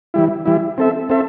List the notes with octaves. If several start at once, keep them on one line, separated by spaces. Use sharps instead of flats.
E3 G3 E4
E3 G3 E4
C4 A4 E5
C4 A4 E5